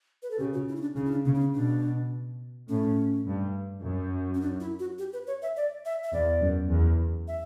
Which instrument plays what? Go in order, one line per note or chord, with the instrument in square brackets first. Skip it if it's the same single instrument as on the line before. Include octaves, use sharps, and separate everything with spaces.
[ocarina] B4
A4
[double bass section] C#3 [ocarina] G4
[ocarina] F#4
E4
C#4
D4
[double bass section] C#3 [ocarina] C#4
[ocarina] E4
D4
[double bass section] C#3 [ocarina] B3
[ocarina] D4
C#4
[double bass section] B2 [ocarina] D4
[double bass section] A2 [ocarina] C#4
[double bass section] G2
F#2
[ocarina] C#4
D4
E4
F#4
G4
B4
C#5
E5
D5
E5
E5
[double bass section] E2 [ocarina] D5
[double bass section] F#2
E2
[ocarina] E5